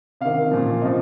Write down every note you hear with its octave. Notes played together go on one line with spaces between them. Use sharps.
C3 D#3 F5
A#2 F3
C3 F3 D#5